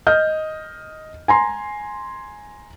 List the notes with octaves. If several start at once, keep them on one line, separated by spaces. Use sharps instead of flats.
D#5 F6 G6
G#5 A#5 C6